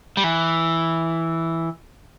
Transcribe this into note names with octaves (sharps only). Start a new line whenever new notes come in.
G3
E3